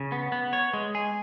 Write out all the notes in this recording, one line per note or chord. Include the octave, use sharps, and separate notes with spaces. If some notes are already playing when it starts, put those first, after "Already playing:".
Already playing: C#3
B3
B3
C#5
G#3
G#4